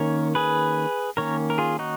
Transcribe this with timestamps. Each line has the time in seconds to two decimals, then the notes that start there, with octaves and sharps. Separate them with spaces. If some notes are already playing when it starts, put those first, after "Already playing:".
Already playing: D#3 A#3 C#4 A#4 C#5
0.35 G#4 B4
1.17 D#3 A#3 C#4 A#4 C#5
1.50 A#4
1.58 F4 G#4
1.79 D#4 F#4